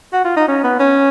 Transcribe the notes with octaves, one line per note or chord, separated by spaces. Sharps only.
F#4
F4
D#4
C#4
B3
C#4